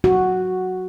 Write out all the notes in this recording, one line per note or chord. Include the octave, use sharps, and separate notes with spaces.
F#4